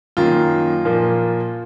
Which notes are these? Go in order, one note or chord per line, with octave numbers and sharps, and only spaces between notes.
F#2 D#3 A#3 F4
A#2 F3 A#3